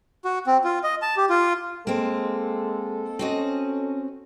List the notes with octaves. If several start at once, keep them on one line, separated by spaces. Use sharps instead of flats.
F#4
C4
F4
D#5
A5
G4
F4
G#3 A#3 C4 A4
C4 C#4 F#4 D#5